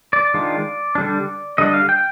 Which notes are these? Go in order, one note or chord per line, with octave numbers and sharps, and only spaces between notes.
D5
D#3 G#3 D4 F4
D3 G3 D4
D3 G3 D4 D#5
F5
G5